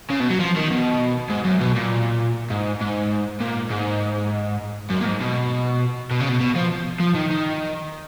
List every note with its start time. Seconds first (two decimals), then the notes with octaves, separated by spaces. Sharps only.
0.10 C#3
0.20 B2
0.30 F#3
0.40 F3
0.56 D#3
0.70 B2
1.30 G#2
1.45 F#2
1.61 B2
1.76 A#2
2.50 G#2
2.81 G#2
3.40 A#2
3.70 G#2
4.90 F#2
5.01 A#2
5.05 G#2
5.21 B2
6.11 B2
6.20 C#3
6.28 B2
6.40 B2
6.55 F3
7.00 F3
7.15 D#3
7.31 D#3